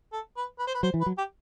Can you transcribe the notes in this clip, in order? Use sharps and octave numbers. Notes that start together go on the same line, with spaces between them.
A4
B4
B4
C5
B4
F#3 C5
E3
B4
F#3
G4